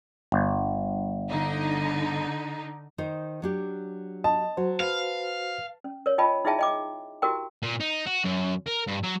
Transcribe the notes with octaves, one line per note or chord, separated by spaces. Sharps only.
G1
D3 D#4
D#3 D#4 C5
F#3 D4 G4
D#5 A5
F#3 F#4 C5
B4 F5
C#4
A#4 C#5
F4 D#5 G5 A5 B5
D#4 E4 G#4 E5 G5 A5
D#5 G5 D6
E4 F#4 G4 A#4 G5
A#2
D#4
F#4
F#2
A#4
G2
F#3